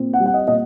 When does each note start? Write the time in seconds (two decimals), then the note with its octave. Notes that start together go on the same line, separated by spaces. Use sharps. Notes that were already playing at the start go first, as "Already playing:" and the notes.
Already playing: A#2 C4
0.14 F#5
0.20 G3
0.26 F#5
0.34 D#5
0.47 A#2 D#5